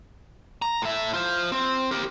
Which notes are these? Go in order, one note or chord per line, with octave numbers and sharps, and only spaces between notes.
A#5
A2 E5
F4 C5
C4
G4 A#4